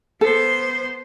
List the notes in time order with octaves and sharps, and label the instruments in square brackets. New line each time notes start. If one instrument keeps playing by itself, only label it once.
[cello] B3 C5 [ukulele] A4